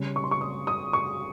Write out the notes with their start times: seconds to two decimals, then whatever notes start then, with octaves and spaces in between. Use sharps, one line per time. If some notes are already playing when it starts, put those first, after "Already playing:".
Already playing: C#3 G3 C#4
0.16 C#6
0.24 C6
0.31 C#6
0.41 D#6
0.67 D#6
0.93 C#6